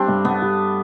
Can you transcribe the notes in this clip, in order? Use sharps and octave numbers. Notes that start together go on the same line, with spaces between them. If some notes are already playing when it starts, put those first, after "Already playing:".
Already playing: G3 A3 C4 D4
G2
G2 B3
G3